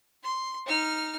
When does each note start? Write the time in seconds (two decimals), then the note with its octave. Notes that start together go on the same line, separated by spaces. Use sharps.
0.24 C6
0.66 D#4 F6